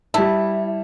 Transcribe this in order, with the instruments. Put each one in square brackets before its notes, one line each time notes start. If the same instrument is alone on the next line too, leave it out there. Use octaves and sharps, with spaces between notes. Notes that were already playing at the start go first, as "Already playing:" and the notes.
[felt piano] G3 A5 [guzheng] E4